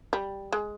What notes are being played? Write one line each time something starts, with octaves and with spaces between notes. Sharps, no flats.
G3
G#3